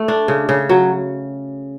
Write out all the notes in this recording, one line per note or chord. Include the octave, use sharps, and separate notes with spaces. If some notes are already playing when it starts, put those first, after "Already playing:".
Already playing: A3
D4
C#3
C#3
F#3